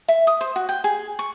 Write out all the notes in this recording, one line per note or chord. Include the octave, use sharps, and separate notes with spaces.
E5
D#6
C5
F#4
G5
G#4
C#6